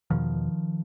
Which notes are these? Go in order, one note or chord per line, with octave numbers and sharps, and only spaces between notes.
E2 B2 D#3 F3